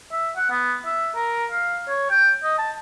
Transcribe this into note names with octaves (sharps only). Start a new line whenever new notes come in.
E5
F#5
B3
E5
A#4
F5
C#5
G5
D#5
A5